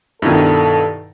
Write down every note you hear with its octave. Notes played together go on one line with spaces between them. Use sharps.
G2 B2 D#3 E4 A4